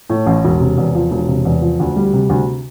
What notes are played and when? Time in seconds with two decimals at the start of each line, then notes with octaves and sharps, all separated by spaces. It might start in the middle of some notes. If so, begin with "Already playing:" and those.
0.10 A2
0.26 A1
0.45 E1
0.60 C3
0.77 E2
0.95 F3
1.11 E1
1.28 C3
1.45 E2
1.62 F3
1.80 D2
1.96 G3
2.13 C3
2.30 D2